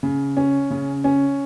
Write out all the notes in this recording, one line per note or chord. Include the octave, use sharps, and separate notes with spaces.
C#3
C#4
C#3
C#4